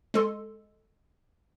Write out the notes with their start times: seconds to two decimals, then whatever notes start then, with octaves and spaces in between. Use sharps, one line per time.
0.14 G#3 A4 C6